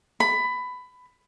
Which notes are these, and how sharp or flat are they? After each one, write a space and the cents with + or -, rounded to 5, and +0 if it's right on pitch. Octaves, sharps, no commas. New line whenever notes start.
B5 +15